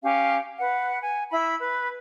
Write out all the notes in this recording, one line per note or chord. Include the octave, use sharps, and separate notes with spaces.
C#4 G4 F5
B4 F#5
G#5
E4 E5 B5 E6
B4